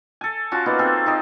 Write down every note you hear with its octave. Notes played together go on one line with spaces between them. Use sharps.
A4 G#5
C#4 F4 F#4 A5
A#3 B3 D#4 D5
C4 G#4 A4
D#4 G4 A4